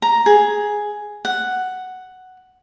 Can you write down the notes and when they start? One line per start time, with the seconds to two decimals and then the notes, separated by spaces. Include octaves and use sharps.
0.02 A#5
0.26 G#4
1.25 F#5